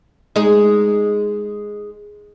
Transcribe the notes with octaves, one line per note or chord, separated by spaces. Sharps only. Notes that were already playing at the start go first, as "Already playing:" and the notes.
G#3 D#4 G#4